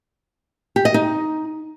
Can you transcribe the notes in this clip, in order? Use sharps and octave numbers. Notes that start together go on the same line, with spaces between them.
G4
D#5
D#4